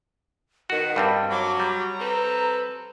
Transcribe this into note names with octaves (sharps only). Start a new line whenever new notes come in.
B2 D#3 F#4 F#5
G2 G3 C4 G5
F#3 D6
G3 A#5
C4 A4 B4